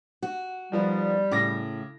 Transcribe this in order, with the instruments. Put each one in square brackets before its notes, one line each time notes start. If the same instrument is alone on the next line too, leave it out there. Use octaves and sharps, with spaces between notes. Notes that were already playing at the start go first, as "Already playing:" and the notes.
[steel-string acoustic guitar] F#4
[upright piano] D#3 F3 B3 [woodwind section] G3
[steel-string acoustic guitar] A2 [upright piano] C#3 D6 A#6